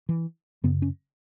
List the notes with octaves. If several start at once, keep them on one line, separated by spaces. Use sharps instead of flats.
E3
F#2 C#3 B3
C#4